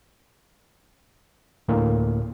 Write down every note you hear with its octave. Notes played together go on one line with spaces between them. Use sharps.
D2 A2 A#3